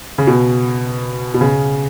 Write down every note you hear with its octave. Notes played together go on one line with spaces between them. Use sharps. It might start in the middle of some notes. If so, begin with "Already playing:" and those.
C#3
B2
B2
C#3